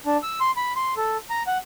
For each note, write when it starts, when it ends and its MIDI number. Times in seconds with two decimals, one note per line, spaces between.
0.06 0.17 62
0.23 0.40 88
0.41 0.51 84
0.57 0.73 83
0.76 0.94 84
0.97 1.17 69
1.30 1.43 82
1.47 1.58 78